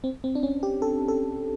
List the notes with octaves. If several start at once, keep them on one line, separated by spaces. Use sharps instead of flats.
C4
C4
D4
C#4
G4
A4
A4